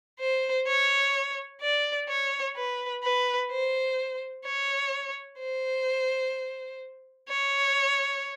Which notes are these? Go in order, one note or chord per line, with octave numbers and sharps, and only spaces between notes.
C5
C#5
D5
C#5
B4
B4
C5
C#5
C5
C#5